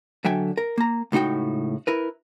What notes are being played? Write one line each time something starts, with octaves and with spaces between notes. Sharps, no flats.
D3 F#3 E5 G5 G#5
A#4
A#3 A#5
C#2 A2 D#4 F#4 G5
E4 A#4 B4